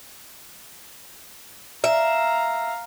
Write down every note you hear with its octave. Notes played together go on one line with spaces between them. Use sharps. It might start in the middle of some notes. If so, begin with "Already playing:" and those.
E5 F5 A#5